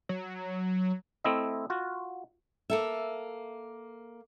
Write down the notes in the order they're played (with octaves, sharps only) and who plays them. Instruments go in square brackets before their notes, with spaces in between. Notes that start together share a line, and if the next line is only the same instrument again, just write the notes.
[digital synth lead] F#3
[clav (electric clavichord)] A3 C4 E4 D#5
F4 F#4
[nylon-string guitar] A#3 A4 E5